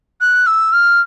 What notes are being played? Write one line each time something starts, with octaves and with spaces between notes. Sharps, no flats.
F#6
E6
F6